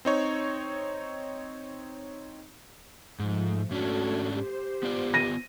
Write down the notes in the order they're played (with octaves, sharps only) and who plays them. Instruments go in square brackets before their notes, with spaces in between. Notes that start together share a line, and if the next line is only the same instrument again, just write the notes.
[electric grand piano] C4 D#4 C#5
[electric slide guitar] G#2 [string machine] F3 A3
[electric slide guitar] G#2 C#4 D4 [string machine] A3 A4 G#6 [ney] F#4
[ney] G4 [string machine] C5
[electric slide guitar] B3 F4 D5
[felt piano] A#6 D#7